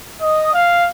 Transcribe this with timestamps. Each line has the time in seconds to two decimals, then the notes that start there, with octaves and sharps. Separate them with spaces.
0.21 D#5
0.53 F5